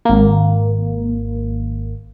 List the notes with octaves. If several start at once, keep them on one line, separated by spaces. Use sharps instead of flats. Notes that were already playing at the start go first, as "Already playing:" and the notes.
G#1 A#3